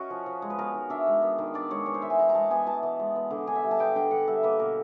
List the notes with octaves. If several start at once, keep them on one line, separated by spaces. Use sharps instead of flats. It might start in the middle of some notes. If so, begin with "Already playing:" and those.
Already playing: C#4 F#4 A#4 D#5
F3
F3
G#3
B4
B3 A#4
D#3
D4 E5
G#3
B3
D#3
D4 D5
G#3 C#5
B3 C#5
C5
E3 E5
G#5
E3 A#5
A#5
G#3 A5
B3 G#5
E3 A5
E3
G#3
B3
D3
D3 G#5
E5
G3
A5
B3 G5
D3 G5
D3 F#5
G3 E5
A#3 B4
B2 A#4